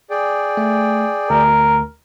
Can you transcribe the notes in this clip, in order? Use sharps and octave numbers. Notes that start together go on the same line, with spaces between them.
G#4 D5 G5
A3
D2 A#4